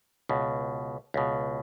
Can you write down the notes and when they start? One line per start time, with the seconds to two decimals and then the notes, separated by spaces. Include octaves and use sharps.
0.29 C#2 B2
1.14 C#2 B2